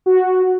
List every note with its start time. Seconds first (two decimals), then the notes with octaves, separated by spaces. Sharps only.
0.06 F#4